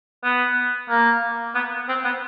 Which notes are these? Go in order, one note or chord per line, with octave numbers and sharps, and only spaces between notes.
B3
A#3
B3
C4
B3